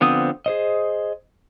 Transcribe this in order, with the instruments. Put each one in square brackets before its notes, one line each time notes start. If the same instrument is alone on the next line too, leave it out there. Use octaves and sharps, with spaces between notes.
[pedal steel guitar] D3 F3 B3 C4 D#6
G#4 C5 D#5